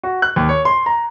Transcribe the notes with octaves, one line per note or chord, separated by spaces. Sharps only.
F#4
F#6
D#2
C#5
C6
A#5